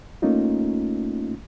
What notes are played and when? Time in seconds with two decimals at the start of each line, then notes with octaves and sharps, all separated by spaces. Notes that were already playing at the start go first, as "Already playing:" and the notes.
0.22 A3 A#3 C#4 D#4 F4